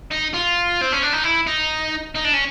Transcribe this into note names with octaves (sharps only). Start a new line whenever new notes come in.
D#4
F4
C4
C#4
D4
D#4
E4
D#4
D#4
D4
C#4